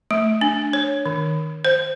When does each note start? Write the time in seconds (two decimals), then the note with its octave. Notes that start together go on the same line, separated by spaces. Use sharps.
0.11 A3
0.41 D4
0.73 C#5
1.06 D#3
1.65 C5